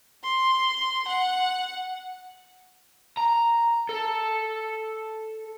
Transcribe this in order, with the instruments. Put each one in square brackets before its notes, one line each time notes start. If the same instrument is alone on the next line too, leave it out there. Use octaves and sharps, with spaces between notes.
[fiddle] C6
F#5
[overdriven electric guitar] A#5
A4